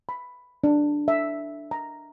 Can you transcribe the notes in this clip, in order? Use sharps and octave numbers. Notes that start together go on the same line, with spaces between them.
B5
D4
E5
A#5